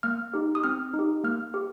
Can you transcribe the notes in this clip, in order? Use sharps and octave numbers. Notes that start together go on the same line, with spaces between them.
A#3 F6
D#4 G4
D#6
C4 F6
D#4
G4
A#3 F6
G4